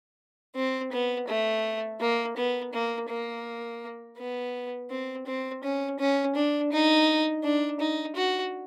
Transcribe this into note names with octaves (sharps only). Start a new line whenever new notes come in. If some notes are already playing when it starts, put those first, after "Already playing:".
C4
B3
A3
A#3
B3
A#3
A#3
B3
C4
C4
C#4
C#4
D4
D#4
D4
D#4
F#4